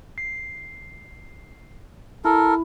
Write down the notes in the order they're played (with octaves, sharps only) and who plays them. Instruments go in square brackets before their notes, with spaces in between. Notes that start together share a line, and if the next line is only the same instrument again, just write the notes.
[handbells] C7
[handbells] E4 [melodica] A4 A#4